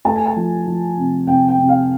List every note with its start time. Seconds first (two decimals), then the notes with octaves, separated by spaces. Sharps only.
0.05 A3 A5
0.16 G#5
0.26 A5
0.37 F3
0.67 F3
0.98 C3
1.27 C3 G5
1.48 G5
1.59 C3
1.69 F5